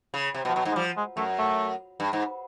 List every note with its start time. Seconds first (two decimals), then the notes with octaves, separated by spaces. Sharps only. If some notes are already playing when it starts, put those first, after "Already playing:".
0.14 C#3
0.34 C3
0.45 B2 F3
0.55 B2 F#3
0.65 G#2
0.72 G#3
0.76 F3 G3
0.97 G#3
1.17 F#2 A3
1.39 A3
2.00 G2
2.13 G#2